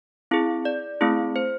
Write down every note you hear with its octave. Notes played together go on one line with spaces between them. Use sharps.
C4 E4 G#4
D5
A3 C4 E4 G#4
C5